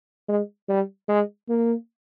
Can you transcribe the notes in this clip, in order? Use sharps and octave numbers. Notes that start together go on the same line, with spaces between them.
G#3
G3
G#3
A#3